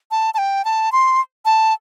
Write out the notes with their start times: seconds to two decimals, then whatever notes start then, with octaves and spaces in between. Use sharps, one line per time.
0.11 A5
0.34 A5
0.38 G5
0.65 A5
0.92 C6
1.45 A5